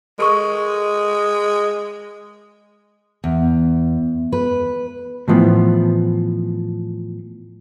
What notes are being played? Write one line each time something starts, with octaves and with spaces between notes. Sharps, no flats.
G#3 A4 A#4 C#6
E2
B4
A2 E3 F3 B3